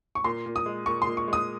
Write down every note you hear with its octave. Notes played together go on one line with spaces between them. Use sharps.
C#6
A#2 C6
A#2
D#6
G#3
A#2 C#6
C6
A#2
C#6
G#3
D#6